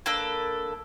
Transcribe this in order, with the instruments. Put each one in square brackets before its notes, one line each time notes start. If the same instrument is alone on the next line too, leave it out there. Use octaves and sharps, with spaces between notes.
[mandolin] A#3 D4 A4 B4